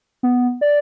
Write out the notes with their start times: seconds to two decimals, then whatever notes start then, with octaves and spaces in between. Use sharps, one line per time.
0.23 B3
0.61 D5